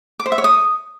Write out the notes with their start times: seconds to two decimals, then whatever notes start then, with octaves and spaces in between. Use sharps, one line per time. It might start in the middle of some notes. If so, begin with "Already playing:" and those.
0.20 D6
0.26 C5
0.32 E5
0.38 C#5
0.44 D#6